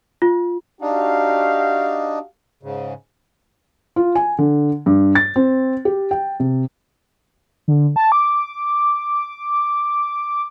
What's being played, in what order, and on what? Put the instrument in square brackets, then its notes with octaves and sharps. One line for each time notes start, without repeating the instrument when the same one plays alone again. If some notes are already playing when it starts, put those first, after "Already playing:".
[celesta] F4
[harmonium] D4 D#4 [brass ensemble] F#4 G4 F5
[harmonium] G#2 C#3
[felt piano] F4
G#5
D3
G2
A6
C4
G4
G5
C3
[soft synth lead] D3
A5
D6